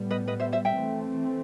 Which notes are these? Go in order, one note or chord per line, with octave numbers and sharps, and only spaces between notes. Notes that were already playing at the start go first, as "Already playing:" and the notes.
Already playing: A2 G3 B3
B4 D#5
B4 D#5
C5 E5
C5 E5
E5 G5
E3 A3 C4